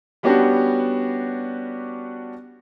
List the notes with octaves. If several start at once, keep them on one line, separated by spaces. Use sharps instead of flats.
G3 B3 C#4 D4 F#4 G4